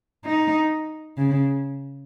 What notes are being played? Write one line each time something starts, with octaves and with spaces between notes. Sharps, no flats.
D#4
C#3